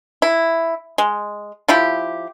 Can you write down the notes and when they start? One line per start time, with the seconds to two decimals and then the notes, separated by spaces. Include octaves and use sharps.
0.22 E4
0.98 G#3
1.68 F3 E4 G4